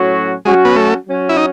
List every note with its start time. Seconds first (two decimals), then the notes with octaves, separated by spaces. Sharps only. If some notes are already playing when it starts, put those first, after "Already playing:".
Already playing: A2 F#3 C#4 F#4
0.45 F#3 G#3 C#4 F#4
0.65 B3
0.76 A3
1.06 F#3 C#4 F#4
1.29 E4
1.37 D#4